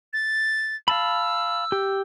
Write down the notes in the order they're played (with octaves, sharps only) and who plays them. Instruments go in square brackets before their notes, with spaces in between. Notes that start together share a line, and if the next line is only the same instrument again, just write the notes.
[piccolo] A6
[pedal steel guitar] F5 A5 B5 [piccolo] E6
[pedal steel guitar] G4